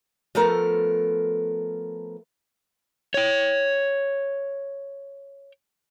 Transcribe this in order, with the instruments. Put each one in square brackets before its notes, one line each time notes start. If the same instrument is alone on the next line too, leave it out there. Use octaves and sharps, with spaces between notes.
[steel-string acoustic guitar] F3 A3 B3 A4 A#4
[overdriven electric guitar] C#5 G5